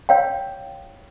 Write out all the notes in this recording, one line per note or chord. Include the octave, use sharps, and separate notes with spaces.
C#5 F5 G5